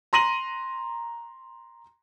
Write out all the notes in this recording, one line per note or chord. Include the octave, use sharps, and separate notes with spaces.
A#5 C6 A#6 D#7 F#7